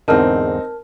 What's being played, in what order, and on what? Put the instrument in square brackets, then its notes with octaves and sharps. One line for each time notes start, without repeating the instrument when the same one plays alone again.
[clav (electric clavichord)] E2 G#2 D3 [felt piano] C4 D#4 [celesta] A#4 A5 F6